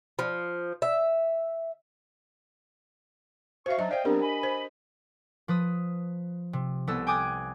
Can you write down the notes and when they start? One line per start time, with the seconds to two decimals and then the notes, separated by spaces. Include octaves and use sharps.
0.19 F3
0.82 E5
3.66 F#4 C5 E5 F5 C#6
3.79 F#3 D4 D#5 E5
3.91 C5 D5 D#5 F5 G5
4.05 F#3 B3 C4 D4 G4 A#4
4.21 D#5 G#5 B5
4.43 C5
5.48 F3 B4 D#6
6.53 C3
6.87 C2 B3 A4 E6
7.07 G5 G#5 D6 D#6 F#6 G#6